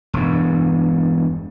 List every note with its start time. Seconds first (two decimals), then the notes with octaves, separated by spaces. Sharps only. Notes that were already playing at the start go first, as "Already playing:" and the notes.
0.13 E1 G2